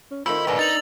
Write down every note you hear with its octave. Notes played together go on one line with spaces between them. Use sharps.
C#4
D#3 A3 C4 E4 F4 B5 E6
B1 G#2 D4 A#4 B4 D#5
D#4 A6 F7 F#7